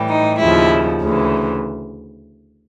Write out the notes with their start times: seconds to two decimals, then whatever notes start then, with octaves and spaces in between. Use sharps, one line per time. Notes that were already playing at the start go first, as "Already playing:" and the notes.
Already playing: A2 E3 G3
0.09 D#4
0.39 D#2 C#3 F3 E4
1.00 D2 C#3 E3